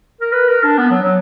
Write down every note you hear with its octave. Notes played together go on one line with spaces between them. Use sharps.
A#4
B4
A#4
D4
B3
F#3
F#3